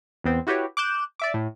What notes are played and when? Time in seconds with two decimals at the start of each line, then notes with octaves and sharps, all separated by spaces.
0.24 E2 B3 C4
0.47 E4 F#4 G4 B4 C#5
0.77 D6 F#6 G6 E7
1.20 D5 E5 D6
1.34 A2